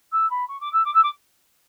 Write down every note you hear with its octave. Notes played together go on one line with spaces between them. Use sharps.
E6
B5
C#6
D6
E6
D6
E6
D6